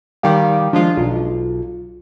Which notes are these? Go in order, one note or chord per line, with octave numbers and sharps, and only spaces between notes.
D#3 G3 G4 F5 G5 D6
F3 G#3 D4 F4
B1 F4